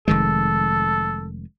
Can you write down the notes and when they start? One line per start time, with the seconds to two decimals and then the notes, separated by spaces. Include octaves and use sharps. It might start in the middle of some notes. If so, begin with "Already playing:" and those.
0.08 F1 D#3 G#3 A4